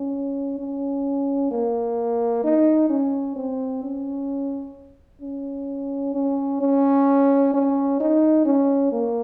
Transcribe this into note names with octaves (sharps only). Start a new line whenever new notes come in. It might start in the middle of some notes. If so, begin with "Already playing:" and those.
Already playing: C#4
C#4
A#3
D#4
C#4
C4
C#4
C#4
C#4
C#4
C#4
D#4
C#4
A#3